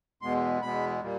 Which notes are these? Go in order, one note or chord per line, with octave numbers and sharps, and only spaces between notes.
E2 B2 G#3 B3 C6
E2 B2 G#3 B3 B5
A#2 G3 A#3